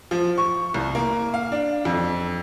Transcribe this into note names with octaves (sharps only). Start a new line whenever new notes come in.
F3
C#6
C2
A#3
F5
D4
F2